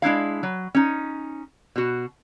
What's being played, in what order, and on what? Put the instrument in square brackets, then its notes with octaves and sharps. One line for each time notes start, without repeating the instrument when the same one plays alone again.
[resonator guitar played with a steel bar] G#3 D4 E4 F5
F#3
C#4 D#4
B2 F#4